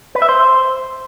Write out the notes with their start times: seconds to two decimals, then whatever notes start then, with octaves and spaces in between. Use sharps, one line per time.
0.15 B4
0.22 E5
0.29 C5